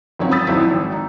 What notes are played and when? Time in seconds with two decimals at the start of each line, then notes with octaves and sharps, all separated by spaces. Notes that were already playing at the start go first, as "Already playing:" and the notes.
0.19 G#1 F#3 C4 C#4 F4
0.31 B5 D#6 E6 G6 A6 B6
0.47 G#1 F2 F#3 E4 B6
0.70 G#1
0.92 D#4